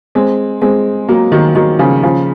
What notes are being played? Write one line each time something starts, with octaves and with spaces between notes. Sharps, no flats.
G#3 C4
G#3 C4
F#3 A#3
D#3 F#3
D#3 F#3
C#3 F3
C#3 F3